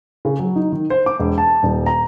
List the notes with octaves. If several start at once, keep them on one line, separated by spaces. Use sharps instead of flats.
C#3
F#3
D#4
D#3
C5
D6
E1
A5
D#1
A#5